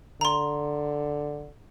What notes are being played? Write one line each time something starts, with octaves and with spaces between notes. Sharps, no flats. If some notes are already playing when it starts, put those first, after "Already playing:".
D3 A#5 C6